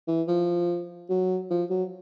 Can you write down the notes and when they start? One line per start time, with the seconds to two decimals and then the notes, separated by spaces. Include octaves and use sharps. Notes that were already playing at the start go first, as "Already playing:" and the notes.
0.08 E3
0.28 F3
1.10 F#3
1.51 F3
1.70 F#3